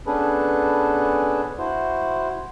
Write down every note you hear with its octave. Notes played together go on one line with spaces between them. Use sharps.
B3 C#4 D4 G#4 A4 B4
E4 F#4 C5